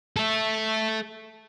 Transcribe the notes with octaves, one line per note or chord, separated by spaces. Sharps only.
A4 E5